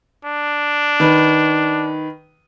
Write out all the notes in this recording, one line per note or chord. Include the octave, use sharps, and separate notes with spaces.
D4
D#3 B4